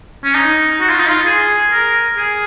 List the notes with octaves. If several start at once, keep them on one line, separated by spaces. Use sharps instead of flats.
C#4
D#4
F#4
F4
D#4
F4
G#4
A#4
G#4